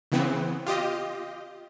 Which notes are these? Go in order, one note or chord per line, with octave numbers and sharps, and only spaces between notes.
C#3 E3 B3 C4
F4 G4 D#5